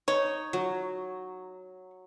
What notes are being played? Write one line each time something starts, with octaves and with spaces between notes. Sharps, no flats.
D#4 C#5
F#3